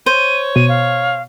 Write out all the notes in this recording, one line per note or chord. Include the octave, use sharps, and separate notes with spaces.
C5 C#5 D#7
B2 D#7
F5